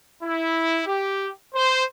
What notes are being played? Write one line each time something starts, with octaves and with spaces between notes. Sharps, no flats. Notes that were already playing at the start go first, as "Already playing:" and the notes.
E4
G4
C5